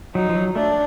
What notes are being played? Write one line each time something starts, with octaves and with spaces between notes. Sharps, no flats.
F#3 D#4
F3
F#3
A3 D4